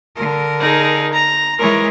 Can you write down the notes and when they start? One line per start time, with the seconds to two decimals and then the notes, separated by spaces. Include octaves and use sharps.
0.16 D3 A#4
0.60 D#4 G#4
1.12 A#5
1.58 E3 G#3 A#4 C#5